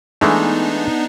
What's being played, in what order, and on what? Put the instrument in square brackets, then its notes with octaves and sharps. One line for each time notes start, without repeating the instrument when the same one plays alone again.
[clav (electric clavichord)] E3 G#3 A3 [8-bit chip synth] B3 D4 D#4